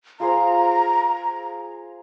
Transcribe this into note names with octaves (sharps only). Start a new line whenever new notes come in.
F4 G#4 C5 A#5